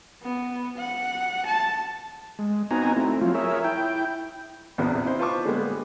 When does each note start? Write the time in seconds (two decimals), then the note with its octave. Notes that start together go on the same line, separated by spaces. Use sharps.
0.23 B3
0.78 F#5
1.46 A5
2.39 G#3
2.71 B3 C4 D#4 F#4 G#5 A#5
2.96 A3 C4 E4
3.21 F3 F#3 F4
3.34 G#4 A#4 C#5 E5
3.64 E4 G5
4.78 A#1 E2 C3 B3 C4 D4
5.04 D#4 E4 C5
5.19 F4 B4 C5 A5 C#6 D6
5.44 D3 G3 G#3 A#3 B3